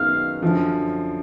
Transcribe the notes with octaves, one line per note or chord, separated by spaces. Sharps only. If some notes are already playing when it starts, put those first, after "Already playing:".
Already playing: F#2 D#3 G#3 B3 F5
F#2 D3 F3